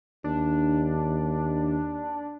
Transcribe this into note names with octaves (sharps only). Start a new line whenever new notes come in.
D#2 D4